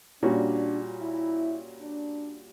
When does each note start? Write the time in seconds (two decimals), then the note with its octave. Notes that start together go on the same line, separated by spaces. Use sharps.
0.23 A#2 G3 C#4 D4 F#4
1.02 E4
1.81 D4